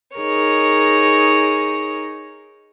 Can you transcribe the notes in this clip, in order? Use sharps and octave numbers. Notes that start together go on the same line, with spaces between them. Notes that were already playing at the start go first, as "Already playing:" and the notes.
D#4 G#4 A#4 C#5